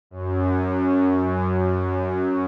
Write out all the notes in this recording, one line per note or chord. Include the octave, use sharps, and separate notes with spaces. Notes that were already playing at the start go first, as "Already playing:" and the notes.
F#2
F#2